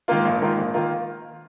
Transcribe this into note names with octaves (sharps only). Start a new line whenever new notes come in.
G#2 D#3 A#3 F4
A#1
G#2 D#3 A#3 F4
A#1
D#3 A#3 F4